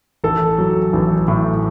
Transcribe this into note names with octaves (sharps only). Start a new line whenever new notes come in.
A1 A4
F#3
A1
A2